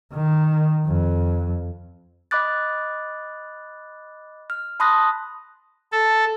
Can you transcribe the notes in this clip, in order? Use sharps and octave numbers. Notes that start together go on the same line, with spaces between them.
D#3
F2
D#5 B5 D6 F#6 A6
F6
A5 B5 C6 D#6 F#6 A#6
A4